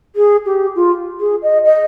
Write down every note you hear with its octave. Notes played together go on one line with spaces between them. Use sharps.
G#4
G4
F4
G#4
D#5
D#5